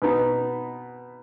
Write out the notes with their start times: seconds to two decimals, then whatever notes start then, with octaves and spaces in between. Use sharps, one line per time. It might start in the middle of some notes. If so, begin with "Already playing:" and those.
0.02 B2 B3 D#4